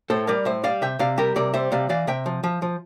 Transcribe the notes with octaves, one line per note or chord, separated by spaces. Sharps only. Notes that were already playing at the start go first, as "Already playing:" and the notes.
A2 A4 C5
G3 A#4 D5
A2 C5 E5
G3 D5 F5
C3 E5 G5
C3 D5 F5
G3 G4 A#4
C3 A#4 D5
G3 C5 E5
C3 D5 F5
E3 D5 F5
C3 E5 G5
F3
F3
F3